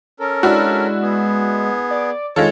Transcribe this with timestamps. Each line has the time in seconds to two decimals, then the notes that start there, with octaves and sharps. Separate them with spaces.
0.20 C#4 A4 A#4
0.43 G#3 D4 E4 F#4
1.02 B3 G#4
1.91 D5
2.36 D#3 G#3 F4 A4 C#5